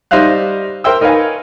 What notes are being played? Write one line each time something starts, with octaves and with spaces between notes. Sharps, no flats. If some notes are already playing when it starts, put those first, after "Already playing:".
G3 D#4 C5 E5 F5 F#6
A#4 C5 E5 G5 E6
D#4 A#4 B4 C#5 F5 G#5